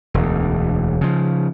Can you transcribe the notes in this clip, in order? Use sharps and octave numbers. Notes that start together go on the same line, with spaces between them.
E1 D2
C#3 F3